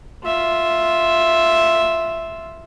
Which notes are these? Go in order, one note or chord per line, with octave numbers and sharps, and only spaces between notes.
F4 E5